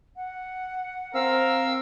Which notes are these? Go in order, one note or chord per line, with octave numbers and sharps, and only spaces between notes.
F#5
C4 A#4 F5 E6